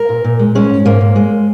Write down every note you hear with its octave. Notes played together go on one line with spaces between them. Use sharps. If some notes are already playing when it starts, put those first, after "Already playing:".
Already playing: A#4
A#2
A#2
G#3
G#3 C#4
G#2
G#2 A#3
G#2
G#3